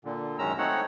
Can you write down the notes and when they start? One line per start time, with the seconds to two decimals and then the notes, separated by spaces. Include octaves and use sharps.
0.05 A#2 D3
0.39 F#2 D#3 G#3 C#4 A#5 E6
0.58 A3 C4 D#4 C#5 F#5